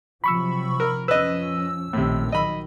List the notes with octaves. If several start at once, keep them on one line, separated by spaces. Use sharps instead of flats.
C3 F3 F#3 B5 C#6 E6
A#4
F2 F3 C#4 B4 D#5 E6
A#1 A2 C3 D#3
A#1 D#3 F#3 D#5 B5